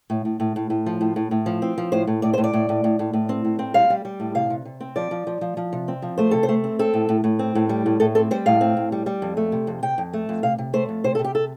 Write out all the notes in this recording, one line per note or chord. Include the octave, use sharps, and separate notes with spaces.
A2
A2
A2
A2
A2
F3
A2
A2
A2
F3
C4
F3
A2 C5
A2
A2 D5
A2 C5
D5
A2
A2
A2
A2
A2
C4
A2
C4
G3 F5
G3
G3
A2
C3 F5
C3
C3
C4
F3 D5
F3
F3
F3
F3
C3
C4
F3
A3 C5
C3 A4
C5
A3
C4
C4 A4
A2
A2
A2
C4
A2
G3
A2
A2 A4
C4 A4
G3 C5
A2 F5
C4
A2
G3
G3
F2
A3
C3
F2
C3 G5
F2
A3
F2
C3 F5
C3
A3 C5
F2
C3 C5
A4
C3
G4
A4